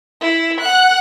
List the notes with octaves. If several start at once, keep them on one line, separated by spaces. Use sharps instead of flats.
E4
F#5 F#6